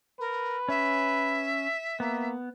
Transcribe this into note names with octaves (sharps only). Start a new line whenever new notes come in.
A#4 B4
C#4 E5
A#3 B3